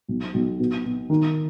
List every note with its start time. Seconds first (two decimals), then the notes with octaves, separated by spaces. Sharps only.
0.08 B1
0.34 B1
0.60 B2
0.85 B2
1.10 D#3